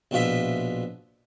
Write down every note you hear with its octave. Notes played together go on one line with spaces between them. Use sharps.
A#1 B2 F4 E5